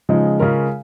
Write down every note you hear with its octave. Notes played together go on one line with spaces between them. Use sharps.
C#3 F3 G#3 D#4
C#3 G#3 C#4 F4 A#4